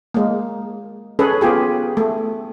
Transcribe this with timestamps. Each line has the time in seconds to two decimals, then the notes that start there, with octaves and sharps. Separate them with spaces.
0.14 G#3 A#3
1.19 C#4 G#4 A4 B4
1.41 B3 F4 G4 G#4
1.97 A3